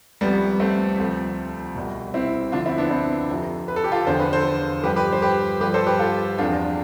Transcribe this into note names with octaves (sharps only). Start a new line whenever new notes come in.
C2 C3 F3 G3 B3
A3 C4
D2 C3 F3
C2 B2
C4 E4
D2 D3 F3 D4 F4
C4 E4
B3 D4
C4 E4
F2 C3 F3
B4
A4
G4
F4 A4
E2 D3 F3 C5
B4
A4 C5
G2 F3 G4 B4
G4 B4
C5
G4 B4
G2 F3 G4 B4
A4 C5
G4 B4
F4 A4
E2 C3 F3 D4 F4